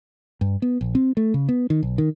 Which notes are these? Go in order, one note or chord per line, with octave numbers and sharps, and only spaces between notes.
G2
B3
A#1
C4
A3
C#3
B3
D#3
B1
D#3